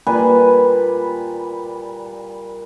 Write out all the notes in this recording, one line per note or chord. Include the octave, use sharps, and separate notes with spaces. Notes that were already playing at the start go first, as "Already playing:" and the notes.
A#2 G3 B4 G#5